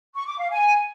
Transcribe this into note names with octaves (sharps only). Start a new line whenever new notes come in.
C#6
D6
F5
G#5